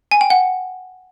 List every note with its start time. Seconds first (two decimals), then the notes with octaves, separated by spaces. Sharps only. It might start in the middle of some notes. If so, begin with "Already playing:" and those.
0.11 G#5
0.21 G5
0.30 F#5